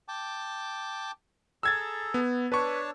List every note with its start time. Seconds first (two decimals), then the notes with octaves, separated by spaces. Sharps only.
0.08 G5 A5 D6
1.63 G#4 A4 A#5 E6 G#6 A6
2.14 B3
2.52 D4 B4 C#5 A5 C#6